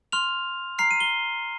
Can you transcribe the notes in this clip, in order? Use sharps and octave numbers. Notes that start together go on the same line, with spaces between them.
C6 F6 F7
A#5 F6 C7
D#7
G7